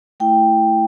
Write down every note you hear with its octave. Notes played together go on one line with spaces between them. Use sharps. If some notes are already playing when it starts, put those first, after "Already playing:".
A3 E4 G5